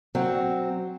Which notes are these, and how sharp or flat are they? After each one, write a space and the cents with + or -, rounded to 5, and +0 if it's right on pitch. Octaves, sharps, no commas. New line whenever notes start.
F#3 +0 C4 +0